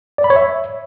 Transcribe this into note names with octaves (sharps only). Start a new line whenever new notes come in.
D5
B5
C#5
E5